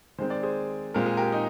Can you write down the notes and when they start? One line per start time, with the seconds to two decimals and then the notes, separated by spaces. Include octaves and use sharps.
0.18 D#3 G#3 C4 C5
0.30 D5
0.43 G#4 C5
0.94 A#2 G#3 C4 A#4
1.06 G#4
1.17 G4 A#4
1.32 D#4